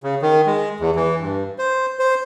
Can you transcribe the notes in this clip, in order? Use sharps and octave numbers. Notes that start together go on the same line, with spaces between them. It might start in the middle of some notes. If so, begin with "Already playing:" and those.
C#3
D#3
G#3
E2
E3
G2
C5
C5